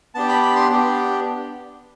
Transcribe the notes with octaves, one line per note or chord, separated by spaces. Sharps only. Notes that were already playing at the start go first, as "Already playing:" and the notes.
B3 D4 G4 A5
B5
B5
C6
B3 D4 G4